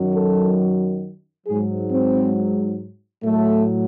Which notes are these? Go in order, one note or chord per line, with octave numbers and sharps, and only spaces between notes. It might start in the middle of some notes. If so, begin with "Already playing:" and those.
Already playing: F#2 D#3 F#3
A4
G#2 F#3 G#4
C4
A2 F#3 A3